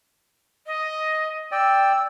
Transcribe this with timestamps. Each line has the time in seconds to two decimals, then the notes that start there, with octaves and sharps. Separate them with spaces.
0.66 D#5
1.52 D5 G5 E6